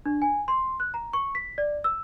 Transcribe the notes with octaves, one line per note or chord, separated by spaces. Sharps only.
D4
G#5
C6
F#6
A#5
C#6
B6
D5
E6